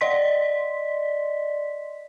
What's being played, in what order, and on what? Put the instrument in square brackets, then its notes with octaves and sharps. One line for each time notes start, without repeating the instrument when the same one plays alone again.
[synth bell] D5 D#5 C6 B6